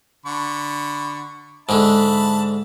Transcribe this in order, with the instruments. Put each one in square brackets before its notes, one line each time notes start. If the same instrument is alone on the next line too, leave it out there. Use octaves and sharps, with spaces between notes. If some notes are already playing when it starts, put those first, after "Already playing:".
[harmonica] D3 B5 C#6
[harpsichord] G#2 D3 [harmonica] E5 A5 B5